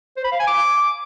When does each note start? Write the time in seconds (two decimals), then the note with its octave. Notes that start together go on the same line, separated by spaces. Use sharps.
0.17 C5
0.24 B5
0.32 F5
0.40 G#5
0.47 D6